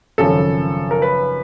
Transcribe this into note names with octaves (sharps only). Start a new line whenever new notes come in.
G#1 F#2 C#3 F3 A4
A#4
B4